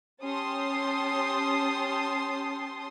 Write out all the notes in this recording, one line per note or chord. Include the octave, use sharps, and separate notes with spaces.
C#4 G4 A5 C6 D#6